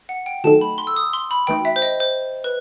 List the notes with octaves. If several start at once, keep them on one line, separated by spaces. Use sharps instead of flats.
F#5
G5
D#3 F#3 A3 D#4 A4 A5
B5
C6
E6
D#6
C6
B5
E3 A3 D#4 F#4 G5
E5
C5
D#5
C5
B4